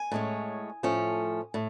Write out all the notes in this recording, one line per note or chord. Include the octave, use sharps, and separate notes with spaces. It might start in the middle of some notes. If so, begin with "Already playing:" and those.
Already playing: G#5
A2 G#3 C#4
A2 F3 A3 C#4
A2